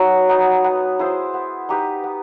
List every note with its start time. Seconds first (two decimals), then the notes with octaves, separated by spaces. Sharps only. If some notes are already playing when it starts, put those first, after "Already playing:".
Already playing: F#3 B3 D#4
0.29 B3 D#4
0.64 B3
0.99 E4 G#4 C5
1.34 B3
1.69 D#4 G4 B4
2.04 B3